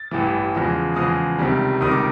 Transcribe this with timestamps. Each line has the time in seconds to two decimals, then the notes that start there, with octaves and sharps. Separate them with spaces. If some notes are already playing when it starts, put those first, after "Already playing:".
Already playing: A6
0.11 A1 G2 E3
0.55 E2 C#3 F3 G#3
0.96 E2 C#3 F3 G#3 D#6
1.39 C#2 C3 D#3 G3
1.80 C#2 C3 D#3 G3 D#6
1.91 D6